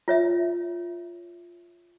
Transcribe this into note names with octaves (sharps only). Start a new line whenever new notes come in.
F4 C#5 E5